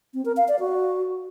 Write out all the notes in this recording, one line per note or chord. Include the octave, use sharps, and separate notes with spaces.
C4
A#4
F5
D5
F#4